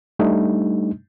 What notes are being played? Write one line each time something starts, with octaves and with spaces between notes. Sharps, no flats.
G3 A3 D4 D#4